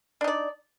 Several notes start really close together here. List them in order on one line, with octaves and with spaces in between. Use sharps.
D4 D#4 D5